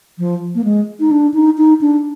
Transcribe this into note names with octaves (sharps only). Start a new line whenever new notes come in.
F3
A#3
G#3
D#4
D4
D#4
D#4
D4